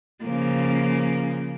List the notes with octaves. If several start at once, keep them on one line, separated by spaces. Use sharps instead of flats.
C#3 F3 A#3